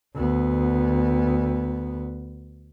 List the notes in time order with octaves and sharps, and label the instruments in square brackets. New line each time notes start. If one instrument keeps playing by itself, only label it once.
[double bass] D2 B3